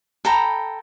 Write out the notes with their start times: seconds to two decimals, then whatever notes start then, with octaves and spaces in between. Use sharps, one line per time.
0.25 A4 G5 A#5 B5